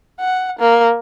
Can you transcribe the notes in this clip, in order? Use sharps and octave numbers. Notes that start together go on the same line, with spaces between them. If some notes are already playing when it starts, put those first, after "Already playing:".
F#5
A#3